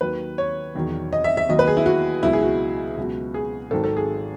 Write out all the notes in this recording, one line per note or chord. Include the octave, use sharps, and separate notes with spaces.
D#2 D#3 F#3 B4
C#5
E1 E2 D#3 F#3
D#5
E5
E5
D#2 D#3 F#3 D#5
B4
G#4
E4
F#4
C#2 B2 F#3 E4
G#4
F#4
C#2 B2 F#3
G#4
G#1 G#2 D#3 F#3 A4
A4
G#4